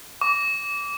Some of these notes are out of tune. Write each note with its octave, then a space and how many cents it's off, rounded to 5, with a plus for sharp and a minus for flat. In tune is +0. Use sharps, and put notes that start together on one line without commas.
D6 -25